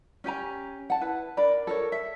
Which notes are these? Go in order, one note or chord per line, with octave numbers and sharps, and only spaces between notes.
C#4 G4 G#5 A#5
F#5 A5
E4 B4
D4 A#4 D5 B5
A4 A#4 C#5
E5